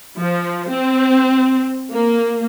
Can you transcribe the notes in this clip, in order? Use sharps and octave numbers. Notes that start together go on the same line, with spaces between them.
F3
C4
A#3